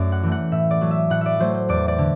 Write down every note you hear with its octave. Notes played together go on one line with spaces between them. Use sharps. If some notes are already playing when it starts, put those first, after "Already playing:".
Already playing: F#2 A3 D5
F#5
E3 A3
F#5
A2 E5
D5
F#3 A3
E5
A2 F#5
D5 E5
F#3 A3 C5
C5
E2 D5
D5
D3